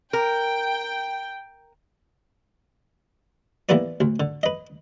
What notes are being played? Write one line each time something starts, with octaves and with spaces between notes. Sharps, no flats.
A#4 G5
E3 A#3 B3 G4 B4 D5
D2
D3
B4 D#5